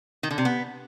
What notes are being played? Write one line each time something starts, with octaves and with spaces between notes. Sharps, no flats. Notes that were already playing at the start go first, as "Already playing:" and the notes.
D#3
D3
C3
B3